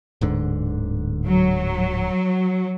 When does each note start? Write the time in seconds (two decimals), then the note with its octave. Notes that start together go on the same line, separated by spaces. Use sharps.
0.21 D1 G#2 D3
1.27 F#3